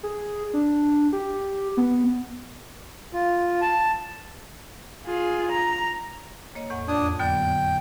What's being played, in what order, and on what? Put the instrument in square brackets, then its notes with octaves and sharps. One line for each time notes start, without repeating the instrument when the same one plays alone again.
[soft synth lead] G#4
D4
G4
B3
[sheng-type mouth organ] F4
A5
[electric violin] F4 G#4
A#5
[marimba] A#3 C#5 D#5
E2 A2 F#5
[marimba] F2 [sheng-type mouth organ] D4 D#6
[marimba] D3 F#3 B3 [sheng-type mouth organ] G5